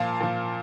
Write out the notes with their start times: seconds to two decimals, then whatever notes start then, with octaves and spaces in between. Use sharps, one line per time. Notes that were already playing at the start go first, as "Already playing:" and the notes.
Already playing: A#2 F3 F5 A5
0.21 A#2 F3